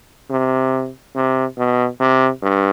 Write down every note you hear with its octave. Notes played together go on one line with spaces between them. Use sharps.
C3
C3
B2
C3
G2